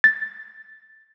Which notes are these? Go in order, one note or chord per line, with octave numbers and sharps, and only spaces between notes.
A6